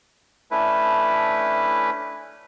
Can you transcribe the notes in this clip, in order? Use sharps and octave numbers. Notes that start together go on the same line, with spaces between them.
A3 C#4 D4 E4 B4